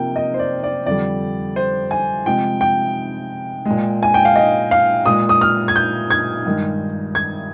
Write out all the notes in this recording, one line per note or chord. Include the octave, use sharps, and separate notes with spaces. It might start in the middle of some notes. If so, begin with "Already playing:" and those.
Already playing: C3 F3 A#3 G5
D#5
C5
D5
D5
F2 D3 G3 D5
C5
G#5
C3 F3 G#3 G5
G5
A#2 G#3
G#5
G5
F5
D#5
F5
A#2 G#3 D#6
D#6
F6
G#6
G6
G#6
G2 D#3 G#3
G#6